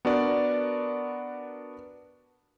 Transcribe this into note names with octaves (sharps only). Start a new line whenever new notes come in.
B3 D4 F#4 A#4 D5